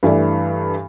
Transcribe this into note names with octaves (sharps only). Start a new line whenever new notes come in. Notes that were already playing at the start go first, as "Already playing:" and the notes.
G2 E3 A3 D5